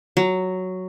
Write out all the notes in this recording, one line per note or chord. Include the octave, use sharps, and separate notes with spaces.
F#3